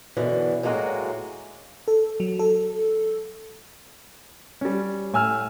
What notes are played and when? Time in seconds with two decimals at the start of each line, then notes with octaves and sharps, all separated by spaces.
0.17 F#2 B2 D3 E3
0.63 A2 F#3 G#3 A#3 F#4
1.88 A4
2.20 F#3
2.39 A4
4.61 G3 C#4
5.13 A2 G#5 E6 F6